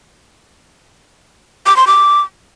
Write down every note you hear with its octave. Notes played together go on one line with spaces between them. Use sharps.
D6
C6
D6